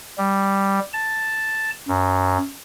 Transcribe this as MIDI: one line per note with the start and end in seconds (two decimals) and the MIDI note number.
0.18 0.79 55
0.93 1.71 81
1.88 2.38 42